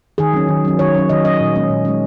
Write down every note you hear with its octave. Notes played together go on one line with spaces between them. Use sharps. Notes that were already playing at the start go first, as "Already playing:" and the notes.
D#3 G#4
F#3 C#4
D#3
F#3 C#4
D#3 C#5
F#3 C#4
D#3 D#5
F#3 C#4 D#5
A#2
G#3 C#4
A#2
G#3 C#4